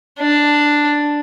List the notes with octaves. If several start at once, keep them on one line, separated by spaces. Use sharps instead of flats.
D4